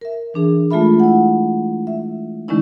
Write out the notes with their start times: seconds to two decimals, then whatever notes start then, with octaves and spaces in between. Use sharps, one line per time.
0.01 A#4 E5
0.34 E3 D4 G#4
0.71 G#3 A3 F4 A4 E5 B5
1.00 E4 F#5
1.87 E5
2.48 D3 D#3 G#3 C#4 D#4 E4